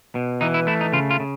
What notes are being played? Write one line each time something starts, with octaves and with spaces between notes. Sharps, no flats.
B2
E3 D#4
E4
A3 E4
D#4
C#3 F4
F4
C#3